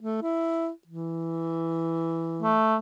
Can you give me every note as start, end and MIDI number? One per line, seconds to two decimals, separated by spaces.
0.02 0.21 57
0.23 0.69 64
0.87 2.58 52
2.42 2.77 57